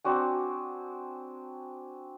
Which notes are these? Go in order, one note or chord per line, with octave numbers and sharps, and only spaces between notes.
C4 D4 F#4 G#5